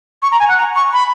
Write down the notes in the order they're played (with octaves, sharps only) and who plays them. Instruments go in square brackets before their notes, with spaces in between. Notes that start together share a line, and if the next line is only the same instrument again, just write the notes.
[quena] C#6
A#5
G#5
F#5
A#5
C#6
B5